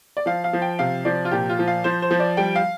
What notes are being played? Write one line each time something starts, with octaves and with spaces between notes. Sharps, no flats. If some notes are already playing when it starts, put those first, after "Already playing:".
D5
F3 F5
F5
F3
G5
C3 F5
F3 D5
F4
A#2 G4
F4
F3
F5
F3 C5
C5
F3
D5
G3 G5
F5